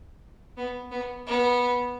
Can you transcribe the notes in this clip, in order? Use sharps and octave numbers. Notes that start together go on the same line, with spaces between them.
B3
B3
B3